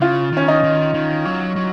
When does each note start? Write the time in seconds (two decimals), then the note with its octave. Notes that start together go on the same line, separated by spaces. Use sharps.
0.01 C#3 F4
0.32 D#3 C#4
0.48 D#4
0.64 D#3
0.94 D#3
1.25 F#3
1.56 F#3